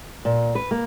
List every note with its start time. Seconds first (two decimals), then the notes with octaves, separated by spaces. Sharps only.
0.25 A#2
0.55 B4
0.71 A#3